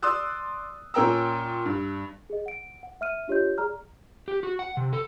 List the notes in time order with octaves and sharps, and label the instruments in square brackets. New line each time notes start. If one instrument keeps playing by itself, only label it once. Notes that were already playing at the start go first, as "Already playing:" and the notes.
[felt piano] D5 C6 D#6 E6 F#6
A#2 C#4 A#4 G5 A#5 E6
G2
[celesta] G#4 D#5
F#5 D7
F#5
E5 F6 D#7
D4 F4 G4 C#5 D#5 G6
G#4 D5 A#5 F6
[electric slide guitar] G4
F#4
F#5
C3
A4